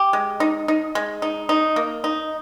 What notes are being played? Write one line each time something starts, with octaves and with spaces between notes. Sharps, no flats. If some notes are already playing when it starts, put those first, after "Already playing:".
Already playing: G4
G#3
D#4
D#4
G#3
D#4
D#4
A#3
D#4